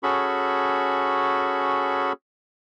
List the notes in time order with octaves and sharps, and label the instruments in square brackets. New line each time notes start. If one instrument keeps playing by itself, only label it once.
[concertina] C#4 F#4 G#4 A4 B5 C#6